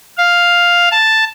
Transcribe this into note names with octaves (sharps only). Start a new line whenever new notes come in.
F5
A5